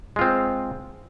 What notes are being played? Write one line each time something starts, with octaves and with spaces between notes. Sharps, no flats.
G#3 C4 F4